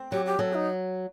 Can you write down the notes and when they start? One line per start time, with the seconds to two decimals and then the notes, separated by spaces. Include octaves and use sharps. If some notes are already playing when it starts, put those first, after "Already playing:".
Already playing: C4
0.11 F#3 G4
0.25 G4
0.39 F#3 A4
0.53 D#4